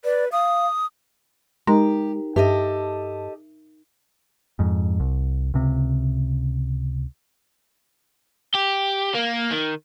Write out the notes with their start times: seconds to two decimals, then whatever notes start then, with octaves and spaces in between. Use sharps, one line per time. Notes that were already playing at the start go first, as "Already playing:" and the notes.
0.04 B4 D5
0.32 F5 D#6
1.67 G#3 D#4 G4 A#4 A#5
2.36 G2 G4 A4 D#5 E5
4.59 F2 G#2
5.00 C2
5.54 C#2 C3
8.54 G4
9.15 A#3
9.51 D#3